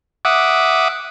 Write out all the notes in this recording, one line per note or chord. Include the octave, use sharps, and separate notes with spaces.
E5 F#5 D6 D#6